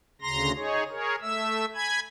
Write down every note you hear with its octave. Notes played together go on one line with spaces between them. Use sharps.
D2 C#3 A#5 C6 A#6
D#4 G#4 C#5
G#4 A#4 C#5
A3 E5 E6
G#5 B5 G#6